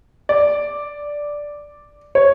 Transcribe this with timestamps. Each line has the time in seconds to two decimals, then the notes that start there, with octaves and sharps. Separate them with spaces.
0.29 D5
2.15 C#5